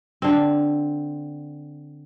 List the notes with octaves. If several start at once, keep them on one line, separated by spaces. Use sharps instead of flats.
D3 C4